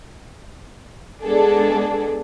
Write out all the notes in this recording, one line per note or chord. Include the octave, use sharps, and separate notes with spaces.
G#3 B3 D4 G#4 A4 D5